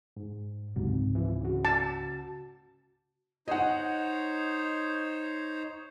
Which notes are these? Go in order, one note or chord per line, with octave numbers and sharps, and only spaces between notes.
G#2
C#2 G#2 C3 F#3
E3 F3
C#3 F#4
A5
D#4 C5 C#5 D#5 F#5